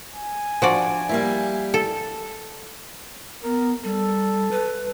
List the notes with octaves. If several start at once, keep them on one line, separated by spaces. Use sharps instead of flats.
G#5
F3 D4 F#4 D5
G3 A#3 E4
A4
B3 A#4
G3 A4
B4